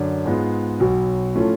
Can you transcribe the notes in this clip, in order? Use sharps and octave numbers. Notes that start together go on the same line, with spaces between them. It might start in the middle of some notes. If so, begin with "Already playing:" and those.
Already playing: F#2 D3 D4
G#2 G#3 B3 F4
B1 B2 F#3
A2 F3 A3 C#4 F4